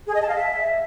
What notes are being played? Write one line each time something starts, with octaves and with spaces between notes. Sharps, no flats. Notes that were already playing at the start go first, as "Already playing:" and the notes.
G#4
D#5
A5
F5
E5